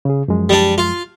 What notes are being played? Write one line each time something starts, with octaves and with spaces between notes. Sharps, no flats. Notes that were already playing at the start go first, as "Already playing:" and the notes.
C#3 G#4
F#2 F3 G#3
G3 D4
F4